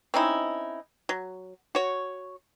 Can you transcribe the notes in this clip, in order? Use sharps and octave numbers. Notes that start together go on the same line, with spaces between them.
C4 C#4 D#4 E4
F#3
F#4 C#5